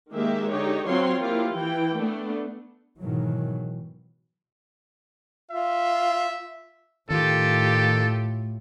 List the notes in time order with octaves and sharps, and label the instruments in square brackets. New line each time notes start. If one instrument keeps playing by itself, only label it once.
[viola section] D#3 G#3 A#3 G4 E5
D3 D#4 G4 C#5
F#3 C4 F4 C#5 C6
A#3 E4 F4 G4
E3 G5
A3 B3 D4
[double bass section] G#2 B2 D#3 E3 F#3
[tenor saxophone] F4 [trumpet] E5
[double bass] A2 [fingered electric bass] D#3 [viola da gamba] F4 G4 [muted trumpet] A4